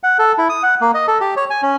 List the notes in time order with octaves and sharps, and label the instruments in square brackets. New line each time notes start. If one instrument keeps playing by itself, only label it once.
[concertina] F#5
A4
E4
D#6
F#5
A#3
D#5
A4
G4
C#5
G#5
C#4